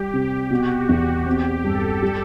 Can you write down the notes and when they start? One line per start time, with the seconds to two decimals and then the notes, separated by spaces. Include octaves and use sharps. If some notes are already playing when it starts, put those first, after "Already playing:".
Already playing: G3 G4
0.13 C3
0.51 B2 F#4
0.89 E2
1.26 C4 G4
1.64 G2 A4
2.02 G3